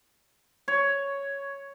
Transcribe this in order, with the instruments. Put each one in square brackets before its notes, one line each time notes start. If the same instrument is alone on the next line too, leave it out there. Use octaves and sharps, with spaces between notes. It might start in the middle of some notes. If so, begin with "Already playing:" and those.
[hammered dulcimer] C#5